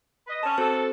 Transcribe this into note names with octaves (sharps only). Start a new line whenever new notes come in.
B4 D#5
C4 C#4 A5
C4 F#4 A4 C5